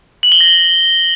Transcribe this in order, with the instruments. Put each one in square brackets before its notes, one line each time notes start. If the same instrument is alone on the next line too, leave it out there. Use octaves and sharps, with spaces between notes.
[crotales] F#7
G7
A#6